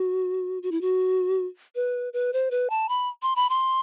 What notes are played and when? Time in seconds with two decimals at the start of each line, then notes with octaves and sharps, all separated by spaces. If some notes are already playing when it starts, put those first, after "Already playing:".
Already playing: F#4
0.63 F#4
0.72 E4
0.81 F#4
1.75 B4
2.13 B4
2.33 C5
2.51 B4
2.70 A5
2.89 B5
3.22 C6
3.36 B5
3.50 C6